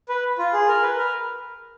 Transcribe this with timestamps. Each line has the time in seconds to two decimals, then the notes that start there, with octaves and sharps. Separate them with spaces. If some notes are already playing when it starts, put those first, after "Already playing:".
0.09 B4
0.38 F4
0.53 G#4
0.68 A#4
0.83 B4
0.97 A#4